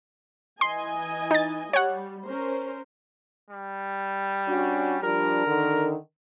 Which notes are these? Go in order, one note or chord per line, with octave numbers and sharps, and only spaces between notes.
E3 D#5 G#5 C6
D#4 A6
G3 C#5 F#5
C#4 A#4 C5
G3
C#4 D4 F#4
F3 G3 D4 A#4
D3 D#3